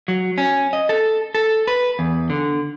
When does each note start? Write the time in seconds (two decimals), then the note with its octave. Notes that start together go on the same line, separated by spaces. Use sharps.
0.08 F#3
0.38 C#4
0.73 D#5
0.89 A4
1.35 A4
1.67 B4
1.99 E2
2.30 D3